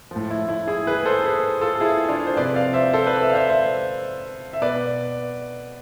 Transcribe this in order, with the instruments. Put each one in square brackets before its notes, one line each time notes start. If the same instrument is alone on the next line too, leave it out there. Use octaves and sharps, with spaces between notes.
[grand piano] A2 F3
E4
E4
E4 G#4
G#4 B4
A4 C5
G#4 B4
F4 A4
E4 G#4
D4 F4
C5
C3 F3 B4 D5
D5 F5
C5 E5
A4 C5
B4 D5
D5
C5 E5
F5
C5 E5
C5 E5
E5
B2 B4 D5